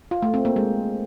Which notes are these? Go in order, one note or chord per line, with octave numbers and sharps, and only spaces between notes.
F4
A3
C4
A#3
G#3